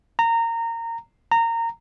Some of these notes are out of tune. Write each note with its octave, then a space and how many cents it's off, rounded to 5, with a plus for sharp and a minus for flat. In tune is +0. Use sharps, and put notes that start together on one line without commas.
A#5 -20
A#5 -20